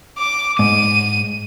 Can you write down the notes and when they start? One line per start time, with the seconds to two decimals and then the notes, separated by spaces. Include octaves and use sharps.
0.19 D6
0.59 G#2 D#7